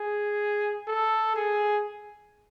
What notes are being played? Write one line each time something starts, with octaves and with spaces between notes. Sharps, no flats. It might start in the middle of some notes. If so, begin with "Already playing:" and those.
Already playing: G#4
A4
G#4